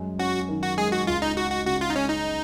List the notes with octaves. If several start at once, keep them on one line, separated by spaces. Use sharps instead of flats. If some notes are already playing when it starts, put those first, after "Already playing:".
Already playing: F#2 G#3
C#4 F#4
D#3
F#4
G#3 G#4
F#4
C#2 F4
D#4
D#4 F#4
F#4
C#3 F#4
F4
D#4
G#3 C#4
D#4